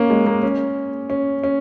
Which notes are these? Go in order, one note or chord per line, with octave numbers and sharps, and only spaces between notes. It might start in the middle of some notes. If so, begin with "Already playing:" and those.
Already playing: A#3 C#4
G#3
A#3
C#4
C#4
C#4